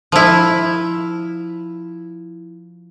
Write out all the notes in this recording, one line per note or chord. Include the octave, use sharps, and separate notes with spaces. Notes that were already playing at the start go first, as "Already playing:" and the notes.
F3 E4